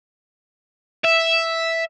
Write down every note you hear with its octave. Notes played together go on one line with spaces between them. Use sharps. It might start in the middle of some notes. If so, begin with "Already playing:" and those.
E5